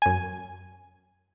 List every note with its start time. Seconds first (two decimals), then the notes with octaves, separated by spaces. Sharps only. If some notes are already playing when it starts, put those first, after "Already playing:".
0.02 F#2 G#5